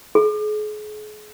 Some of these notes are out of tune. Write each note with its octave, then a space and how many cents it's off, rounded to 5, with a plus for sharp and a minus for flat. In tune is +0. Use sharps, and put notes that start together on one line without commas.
G#4 +35